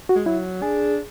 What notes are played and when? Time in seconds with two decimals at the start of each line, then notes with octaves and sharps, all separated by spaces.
0.09 F#4
0.15 G#3
0.26 F#3 E4
0.62 D4 G#4